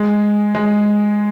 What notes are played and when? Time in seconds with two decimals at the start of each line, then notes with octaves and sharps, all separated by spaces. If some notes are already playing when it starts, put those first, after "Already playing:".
Already playing: G#3
0.55 G#3